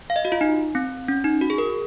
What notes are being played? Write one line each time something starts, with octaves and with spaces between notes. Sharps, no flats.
F5
D#5
F#4
F4
D#4
C4
C#4
D#4
F#4
G#4
A#4